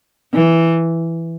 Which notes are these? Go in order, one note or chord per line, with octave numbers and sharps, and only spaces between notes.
E3